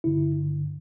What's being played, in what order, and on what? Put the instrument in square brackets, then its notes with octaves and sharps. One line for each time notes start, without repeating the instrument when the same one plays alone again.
[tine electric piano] G2 D3 E4